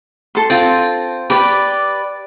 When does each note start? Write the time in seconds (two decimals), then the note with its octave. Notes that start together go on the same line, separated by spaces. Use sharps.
0.35 A4 C6
0.50 C4 F4
1.30 G4 B4 D5